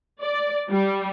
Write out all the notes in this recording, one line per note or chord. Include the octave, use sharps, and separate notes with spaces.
D5
G3